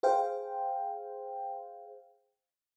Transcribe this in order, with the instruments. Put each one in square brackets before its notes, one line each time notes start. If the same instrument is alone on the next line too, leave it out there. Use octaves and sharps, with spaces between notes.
[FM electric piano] G#4 C5 F5 G5